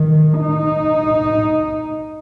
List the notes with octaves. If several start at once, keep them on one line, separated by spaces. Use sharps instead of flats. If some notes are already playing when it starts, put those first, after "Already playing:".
Already playing: D#3
D#4